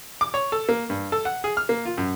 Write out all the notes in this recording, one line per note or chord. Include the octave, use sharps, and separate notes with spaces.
D6
C#5
A4
A#3
G2
A4
F#5
G#4
F6
A#3
F4
F#2